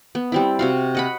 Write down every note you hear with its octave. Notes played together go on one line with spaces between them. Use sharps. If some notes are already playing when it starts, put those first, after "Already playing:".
B3
G3 C4 E4
C3 F#4 F5
D#5 F#5 B5